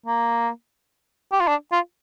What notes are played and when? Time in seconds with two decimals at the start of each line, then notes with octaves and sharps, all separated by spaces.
0.06 A#3
1.32 G4
1.40 F4
1.48 D4
1.72 F4